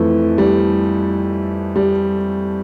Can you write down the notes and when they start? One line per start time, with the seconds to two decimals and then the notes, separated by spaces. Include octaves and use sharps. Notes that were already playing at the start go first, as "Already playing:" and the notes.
Already playing: F2 E3 A3
0.38 G3
1.76 G3